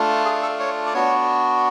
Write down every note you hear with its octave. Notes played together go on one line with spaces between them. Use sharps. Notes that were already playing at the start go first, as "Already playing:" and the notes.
Already playing: A3 D4 F4
G#4
A4
C#5
D5
B3 D4 F#4 C#5